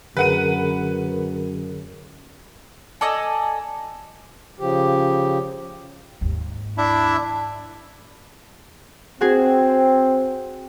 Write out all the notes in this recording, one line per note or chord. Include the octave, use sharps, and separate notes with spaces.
F#2 D3 G#4 A#4 B4 F#5 D#7
A4 D5 D#5 G#5
C#3 F3 G4
D#2 G#2
D4 E4 E5
C4 F#4 G#4